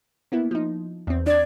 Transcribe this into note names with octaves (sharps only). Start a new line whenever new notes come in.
A#3 B3 E4
F3 D#4
E2 C4
D4 D5 G#6